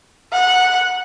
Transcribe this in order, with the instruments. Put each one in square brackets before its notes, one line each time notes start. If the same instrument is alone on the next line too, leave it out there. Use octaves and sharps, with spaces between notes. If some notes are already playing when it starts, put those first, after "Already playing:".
[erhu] F#5